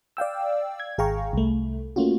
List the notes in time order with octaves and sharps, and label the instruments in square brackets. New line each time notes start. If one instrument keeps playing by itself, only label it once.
[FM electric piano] D5 F5 G5 E6
G#6
G#1 G#4 F5 G5 A#5 C#6
C2 A3
A3 A#3 C#4 F4 F#4